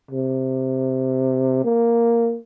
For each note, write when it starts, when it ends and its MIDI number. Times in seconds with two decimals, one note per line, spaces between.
0.11 1.60 48
1.64 2.37 58